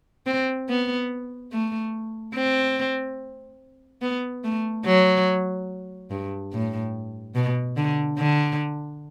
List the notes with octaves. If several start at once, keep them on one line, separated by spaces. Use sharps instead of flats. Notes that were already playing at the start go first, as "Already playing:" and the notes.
C4
B3
A3
C4
B3
A3
F#3
G2
A2
B2
D3
D3